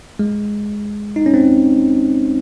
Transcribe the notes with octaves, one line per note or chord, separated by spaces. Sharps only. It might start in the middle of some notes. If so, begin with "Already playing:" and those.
G#3
D#4
C#4
C4